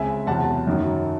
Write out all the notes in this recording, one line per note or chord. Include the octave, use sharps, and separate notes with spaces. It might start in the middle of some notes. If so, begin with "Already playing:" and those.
Already playing: C#2 C#3 G#3 C4 E5 G#5
E2 C3 F#3 F#5 A5
F#2 D#3 F#3